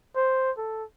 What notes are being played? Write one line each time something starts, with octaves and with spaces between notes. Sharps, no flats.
C5
A4